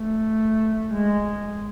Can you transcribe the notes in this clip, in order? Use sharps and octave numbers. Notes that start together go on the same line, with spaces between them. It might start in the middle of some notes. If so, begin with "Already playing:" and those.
Already playing: A3
G#3